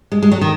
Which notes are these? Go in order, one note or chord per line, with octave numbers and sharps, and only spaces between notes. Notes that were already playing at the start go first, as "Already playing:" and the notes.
G#3
G#3
F#3
D#3